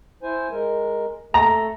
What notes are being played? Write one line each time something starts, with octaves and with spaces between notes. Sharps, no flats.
E4 C5 G#5
G#3 A#4
A3 A4 A#5